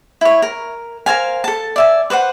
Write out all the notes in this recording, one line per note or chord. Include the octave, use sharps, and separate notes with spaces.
E4 C#5
A#4
A#4 C5 F5 G#5
A4 A5
D5 E5 G#5
B4 C5 D5 F#5